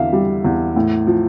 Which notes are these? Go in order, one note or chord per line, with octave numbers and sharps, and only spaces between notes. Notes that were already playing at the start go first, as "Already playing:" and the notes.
Already playing: E2 D3 E5 F5
G3
E2
A2
F3